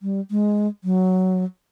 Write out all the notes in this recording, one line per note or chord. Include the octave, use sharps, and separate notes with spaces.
G3
G#3
F#3